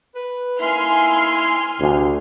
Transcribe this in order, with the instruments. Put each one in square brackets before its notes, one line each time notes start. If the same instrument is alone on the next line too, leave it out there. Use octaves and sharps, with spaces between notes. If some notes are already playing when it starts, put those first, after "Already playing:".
[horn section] B4
[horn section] A#3 D#4 E4 [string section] G#5 C6 F6
[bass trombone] D2 [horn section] C3